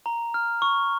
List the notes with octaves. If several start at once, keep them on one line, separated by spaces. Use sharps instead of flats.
A#5
F6
C#6